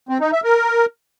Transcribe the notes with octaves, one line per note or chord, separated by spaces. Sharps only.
C4
D#4
E5
A#4